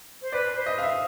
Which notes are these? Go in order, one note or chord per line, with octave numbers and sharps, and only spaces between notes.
C5
B4 D5
C5
D#5
F5
E5